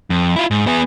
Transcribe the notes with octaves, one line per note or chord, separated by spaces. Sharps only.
F2
E4 F4
G#2
B3 G#4